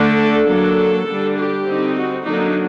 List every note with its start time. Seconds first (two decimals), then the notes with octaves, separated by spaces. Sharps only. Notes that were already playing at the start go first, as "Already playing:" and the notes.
Already playing: D3 A3 D4
0.18 A4
0.47 F#3 A#3 D4 A4
1.06 D3 G3 D4
1.36 G4
1.65 D3 G3 C4 D#4
1.95 F#4
2.24 D3 F#3 A#3 D4 D#4